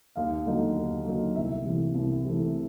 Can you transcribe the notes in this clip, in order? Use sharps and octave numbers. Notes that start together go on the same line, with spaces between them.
D#2 F5
D3 F#3 A#3 D#4
D#2
D3 F#3 A#3 D#4
C2 E5
C3 E3 A3
C2
C3 E3 A3